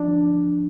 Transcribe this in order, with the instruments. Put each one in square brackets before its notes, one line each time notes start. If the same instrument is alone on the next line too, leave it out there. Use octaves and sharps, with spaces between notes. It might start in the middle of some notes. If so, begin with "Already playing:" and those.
Already playing: [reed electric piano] F3 D4